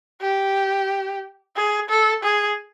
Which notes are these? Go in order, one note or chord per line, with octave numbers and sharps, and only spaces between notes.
G4
G#4
A4
G#4